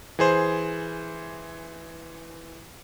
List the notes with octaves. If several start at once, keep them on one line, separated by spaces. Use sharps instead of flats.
E3 G#4 C5